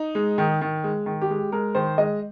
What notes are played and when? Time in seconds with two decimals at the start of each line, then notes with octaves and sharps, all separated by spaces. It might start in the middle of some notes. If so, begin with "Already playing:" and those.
Already playing: D#4
0.15 G#3
0.38 D#3
0.61 D#3
0.84 G#3
1.06 D#3
1.21 G4
1.30 G#3
1.52 G#3 A#4
1.75 D#3 C5
1.98 G#3 D#5